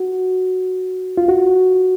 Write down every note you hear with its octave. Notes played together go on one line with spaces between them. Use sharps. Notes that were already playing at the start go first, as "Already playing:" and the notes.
Already playing: F#4
F4
F#4